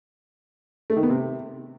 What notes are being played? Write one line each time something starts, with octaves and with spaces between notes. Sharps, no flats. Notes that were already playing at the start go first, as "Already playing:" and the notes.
A3
D#3
B3
C3